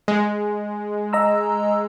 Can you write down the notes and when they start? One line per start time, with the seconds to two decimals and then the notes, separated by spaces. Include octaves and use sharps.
0.08 G#3
1.13 D#5 A#5 E6